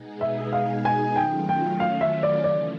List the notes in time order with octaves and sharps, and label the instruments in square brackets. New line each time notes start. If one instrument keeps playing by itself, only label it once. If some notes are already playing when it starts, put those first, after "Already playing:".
Already playing: [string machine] B2 G#3 B3 D#4 G#4
[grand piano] E5
F5
G#5
[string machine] D#3 F#3 A3 C#4 F4 [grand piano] G5
[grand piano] G5
F5
E5
D5
[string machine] C#3 E3 A3 [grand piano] D5